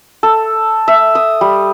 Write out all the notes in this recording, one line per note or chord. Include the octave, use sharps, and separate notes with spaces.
A4
E5
D#6
G3